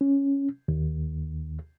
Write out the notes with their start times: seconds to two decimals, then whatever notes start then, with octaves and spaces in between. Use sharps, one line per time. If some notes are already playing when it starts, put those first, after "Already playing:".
0.01 C#4
0.68 D#2